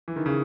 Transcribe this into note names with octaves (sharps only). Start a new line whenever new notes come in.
E3
D#3
C#3